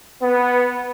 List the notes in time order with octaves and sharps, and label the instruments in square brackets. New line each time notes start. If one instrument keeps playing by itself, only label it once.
[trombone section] B3